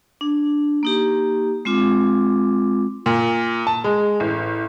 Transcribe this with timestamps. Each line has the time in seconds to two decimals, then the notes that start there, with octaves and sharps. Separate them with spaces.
0.21 D4
0.83 A#3 D#4 G4
1.65 G#3 C4 F4 D6
3.06 A#2
3.67 A5
3.84 G#3
4.20 A1